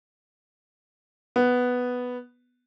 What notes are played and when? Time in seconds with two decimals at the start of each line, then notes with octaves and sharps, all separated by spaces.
1.36 B3